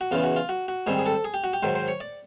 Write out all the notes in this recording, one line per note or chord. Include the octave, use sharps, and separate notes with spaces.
F#4
E2 C#3 E3 F4
F#4
F4
F#4
F#4
G#2 D#3 G3 C4 G#4
G#4
A4
G#4
G4
F#4
G4
G#2 D#3 F#3 C5
C5
C#5
D5